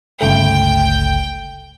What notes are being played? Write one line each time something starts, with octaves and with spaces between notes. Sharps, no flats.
G1 C#2 A3 G5